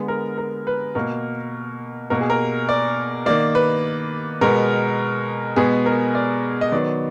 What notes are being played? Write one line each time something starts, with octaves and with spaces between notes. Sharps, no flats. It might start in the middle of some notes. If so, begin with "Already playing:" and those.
Already playing: D3 G#3 B3
A#4
A#4
B4
B2 A#3 A#4
B2 A#3 A#4
G#4
A#4
D5
D#3 A#3 D5
B4
B2 G#3 B3 A#4
B2 G#3 B3 G#4
A#4
D5
D#5
D#3 F#3 B3 D5